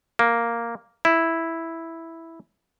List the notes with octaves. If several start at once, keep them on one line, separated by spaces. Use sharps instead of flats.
A#3
E4